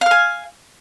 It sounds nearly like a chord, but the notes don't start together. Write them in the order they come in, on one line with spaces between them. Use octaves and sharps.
F5 F6 G#5